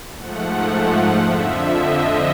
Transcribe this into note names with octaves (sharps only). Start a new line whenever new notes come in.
G#2 F3 A3 F#5
F#5
F2 D3 F3 E5
D#5